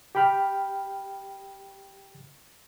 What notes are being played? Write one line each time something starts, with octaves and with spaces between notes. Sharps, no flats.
G4 G5 B5 F6